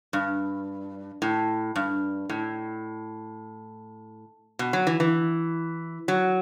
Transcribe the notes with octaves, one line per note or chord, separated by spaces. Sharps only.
G2
A2
G2
A2
B2
F#3
E3
E3
F#3